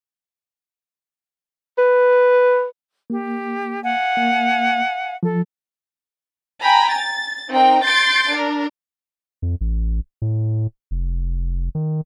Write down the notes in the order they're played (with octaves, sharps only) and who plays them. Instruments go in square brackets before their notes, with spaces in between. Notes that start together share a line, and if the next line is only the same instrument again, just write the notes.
[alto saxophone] B4
[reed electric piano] A#3 [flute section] G4
[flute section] F5 F#5 G#5
[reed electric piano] A#3
[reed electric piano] F3 [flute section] A4
[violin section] G5 G#5 A#5 B5
A6
C4 D#4 A#4 G5
C6 G6 A6 C7 D7
D4 A#4
[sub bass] F2
A1
A2
F1
D#3